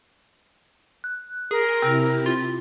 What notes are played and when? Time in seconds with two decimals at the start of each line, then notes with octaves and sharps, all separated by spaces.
1.04 F#6
1.51 G#4 A#4 G#5 C6 A#6
1.82 C3 C4 E4 G4
2.26 F4